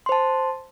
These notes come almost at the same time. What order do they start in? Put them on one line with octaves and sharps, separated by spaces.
C6 C5 A5